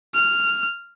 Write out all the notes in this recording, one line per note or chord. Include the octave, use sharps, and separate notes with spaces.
F6